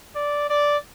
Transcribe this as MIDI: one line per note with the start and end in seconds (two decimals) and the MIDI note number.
0.16 0.48 74
0.49 0.77 74